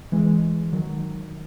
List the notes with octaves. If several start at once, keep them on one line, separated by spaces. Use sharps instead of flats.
E3 G#3
D#3 F#3